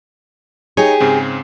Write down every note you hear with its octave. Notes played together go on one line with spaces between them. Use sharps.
D#4 G4 G#4 C#5
G#2 C#3 C4